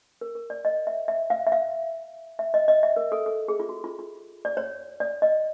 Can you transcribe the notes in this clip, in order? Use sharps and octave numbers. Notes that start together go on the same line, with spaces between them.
A#4
A#4
D5
D#5
E5
E5
F5
E5
F5
E5
D#5
D#5
E5
A#4
A4
A4
G#4
F4
F#4
F4
F4
D5
C#5
D5
D#5